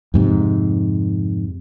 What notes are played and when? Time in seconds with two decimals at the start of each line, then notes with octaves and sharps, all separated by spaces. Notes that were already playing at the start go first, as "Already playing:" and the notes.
0.14 F2 G#2 C3